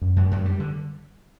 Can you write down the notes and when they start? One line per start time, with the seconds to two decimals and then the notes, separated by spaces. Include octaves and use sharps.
0.02 F#2
0.16 F#2
0.31 F#2
0.46 G3
0.60 D3